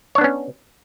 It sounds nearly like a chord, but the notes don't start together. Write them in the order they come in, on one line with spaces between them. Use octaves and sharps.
C#5 D4 B3 C#4